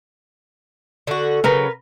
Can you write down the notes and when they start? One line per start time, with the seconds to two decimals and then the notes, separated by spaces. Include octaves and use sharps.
1.07 D3 F#4
1.44 C#3 F#3 A#4 B4